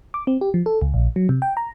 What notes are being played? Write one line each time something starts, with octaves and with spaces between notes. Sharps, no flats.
D6
C4
G4
F3
A4
C#2
A#1
F#3
C3
G5
A#5